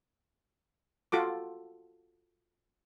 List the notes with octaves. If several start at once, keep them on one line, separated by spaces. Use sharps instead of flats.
F4 F#4 A4 D6